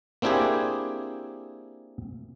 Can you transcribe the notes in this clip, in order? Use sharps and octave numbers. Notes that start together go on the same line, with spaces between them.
A#3 C4 D4 E4 G4 G#4